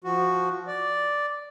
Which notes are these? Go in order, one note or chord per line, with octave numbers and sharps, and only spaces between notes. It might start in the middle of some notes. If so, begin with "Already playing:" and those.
F3 F#4
D5